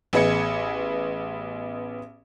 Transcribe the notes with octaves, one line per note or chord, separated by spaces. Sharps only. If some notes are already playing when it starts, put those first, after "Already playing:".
A1 B3 G#4 D#5 G#6 C#7